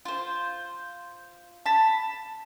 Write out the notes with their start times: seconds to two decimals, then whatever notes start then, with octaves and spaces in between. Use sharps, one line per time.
0.05 F4 C5
1.66 A5 B5